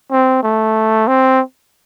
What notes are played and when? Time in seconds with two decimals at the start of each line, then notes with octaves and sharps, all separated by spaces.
0.11 C4
0.43 A3
1.07 C4